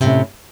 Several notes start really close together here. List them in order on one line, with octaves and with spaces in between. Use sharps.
C3 A2 C#4